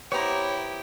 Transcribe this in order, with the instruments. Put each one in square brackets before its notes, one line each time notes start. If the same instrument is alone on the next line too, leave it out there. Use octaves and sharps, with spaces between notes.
[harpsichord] B3 C5 [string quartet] E4 G4 [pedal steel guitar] C#5 A#5